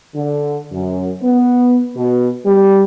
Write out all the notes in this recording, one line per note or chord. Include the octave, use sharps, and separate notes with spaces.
D3
F#2
B3
B2
G3